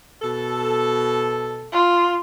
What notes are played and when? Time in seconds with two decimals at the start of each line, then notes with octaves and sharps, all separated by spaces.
0.22 B2 A4
1.73 F4